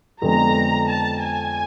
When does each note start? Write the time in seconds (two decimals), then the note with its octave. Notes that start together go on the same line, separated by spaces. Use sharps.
0.21 F2 D3 F3 G#3 B3 A#5
0.89 A5
1.23 G#5